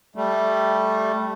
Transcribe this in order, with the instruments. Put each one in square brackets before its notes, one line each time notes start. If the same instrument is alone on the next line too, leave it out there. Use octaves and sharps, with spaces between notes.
[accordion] G3 A3